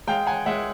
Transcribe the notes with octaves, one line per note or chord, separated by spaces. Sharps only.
G#3 F5 G5
F#5 G#5
G#3 E5 F#5